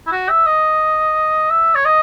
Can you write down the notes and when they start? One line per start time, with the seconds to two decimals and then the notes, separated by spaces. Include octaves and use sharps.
0.07 E4
0.12 F#4
0.29 E5
0.46 D#5
1.50 E5
1.75 C#5
1.85 D#5